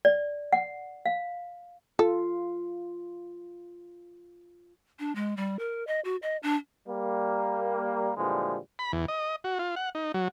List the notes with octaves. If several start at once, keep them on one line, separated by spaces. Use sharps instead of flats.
D5
F#5
F5
F4 A4
D4
G#3
G3
A#4
D#5
F#4
D#5
D4
G3 A#3
A#2 D3 E3 F3 G3 G#3
B5
E2
D#5
F#4
F4
F#5
D#4
F#3